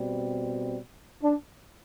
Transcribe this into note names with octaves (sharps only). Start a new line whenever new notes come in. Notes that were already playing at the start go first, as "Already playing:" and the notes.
Already playing: B2 G3 C4
D4